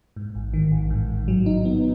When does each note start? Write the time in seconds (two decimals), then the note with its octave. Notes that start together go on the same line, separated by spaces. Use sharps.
0.16 G#2
0.35 A1
0.53 D#3
0.72 A1
0.90 G#2
1.09 A1
1.28 F#3
1.46 D#4
1.65 B3